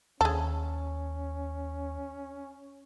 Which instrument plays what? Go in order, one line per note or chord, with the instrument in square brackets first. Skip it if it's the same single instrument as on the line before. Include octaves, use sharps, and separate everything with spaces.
[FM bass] D#2 [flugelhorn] C#4 [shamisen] G#4 A4